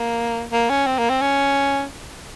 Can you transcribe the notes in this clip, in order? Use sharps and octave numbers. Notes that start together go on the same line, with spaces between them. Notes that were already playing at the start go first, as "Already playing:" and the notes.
Already playing: A#3
A#3
C#4
C4
A#3
C4
C#4